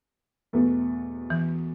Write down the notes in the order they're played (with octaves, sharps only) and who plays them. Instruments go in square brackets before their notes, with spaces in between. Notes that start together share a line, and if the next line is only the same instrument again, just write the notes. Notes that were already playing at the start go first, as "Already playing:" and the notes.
[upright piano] E2 B2 A3
[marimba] E3